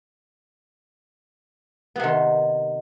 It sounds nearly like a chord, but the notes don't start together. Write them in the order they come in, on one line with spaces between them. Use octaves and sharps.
B3 C3 D#3